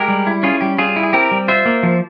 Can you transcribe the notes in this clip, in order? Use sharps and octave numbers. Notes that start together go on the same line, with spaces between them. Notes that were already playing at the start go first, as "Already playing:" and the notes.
Already playing: G#3 G4 A#4
G3
E4
C#4 F4 G#4
G3 G4
G3 F4 G#4
E4
G#4
C4 G4 A#4
G3
F4 C5 E5
A#3
F3